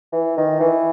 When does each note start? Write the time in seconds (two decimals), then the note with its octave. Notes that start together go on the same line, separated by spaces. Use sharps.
0.13 E3
0.37 D#3
0.61 E3